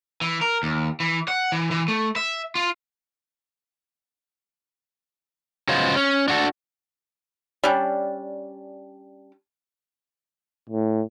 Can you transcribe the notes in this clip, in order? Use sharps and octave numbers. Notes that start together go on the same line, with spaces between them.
E3
A#4
D#2
E3
F#5
E3
E3
A3
E5
F4
C#3 F#3 G#3 B3 F4 C5
C#4
D4 F#4 G#4 A4
G3 C#4 D4
A2